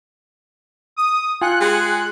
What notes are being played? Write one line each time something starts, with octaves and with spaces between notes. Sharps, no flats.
D#6
F4 G5 G#5 F#6 C#7
G#3